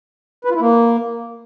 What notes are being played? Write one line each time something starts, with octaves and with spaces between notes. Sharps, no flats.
B4
F4
E4
A#3